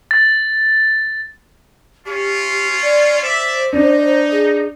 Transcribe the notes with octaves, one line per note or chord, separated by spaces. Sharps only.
A6
C#4 F4 G4
D5
C5 D5 E5
D4 D#4
G#4